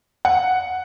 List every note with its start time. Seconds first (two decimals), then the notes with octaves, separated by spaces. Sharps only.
0.25 F#5